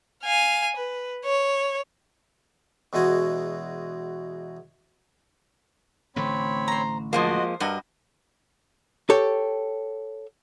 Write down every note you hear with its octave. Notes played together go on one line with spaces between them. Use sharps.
F5 G#5
B4
C#5
E2 B2 G#3 F#4 G#5
A1 D3 A3 C4 C#5 B5
C5 A#5
F3 G#3 A#3 F#4 C5 D#5
G2 F#4 A#4 D#5
G4 A4 C#5